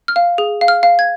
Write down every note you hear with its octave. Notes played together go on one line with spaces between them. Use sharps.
F6
F5
G#4
F5
F6
F5
G#6